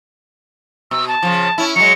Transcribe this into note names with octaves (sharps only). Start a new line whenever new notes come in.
B2 E6
A5
C#3 F3
C#4 E4
F#3 G#3 C#7